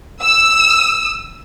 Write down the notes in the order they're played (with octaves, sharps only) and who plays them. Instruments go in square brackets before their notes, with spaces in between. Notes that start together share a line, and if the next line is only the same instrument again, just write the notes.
[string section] E6